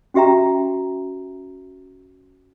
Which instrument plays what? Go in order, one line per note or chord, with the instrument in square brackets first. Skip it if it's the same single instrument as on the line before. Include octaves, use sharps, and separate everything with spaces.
[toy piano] C#4 F#4 G4 E5 G5 A#5